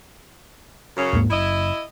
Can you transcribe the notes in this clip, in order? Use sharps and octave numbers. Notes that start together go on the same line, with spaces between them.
F#2 C#3 C#4
D#2 G#2 A#3
F#1 E4 D#5